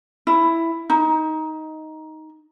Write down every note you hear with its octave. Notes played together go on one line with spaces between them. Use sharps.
E4
D#4